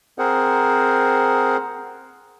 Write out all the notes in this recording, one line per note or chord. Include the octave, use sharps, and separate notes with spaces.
C4 G#4 A#4 C5 F#5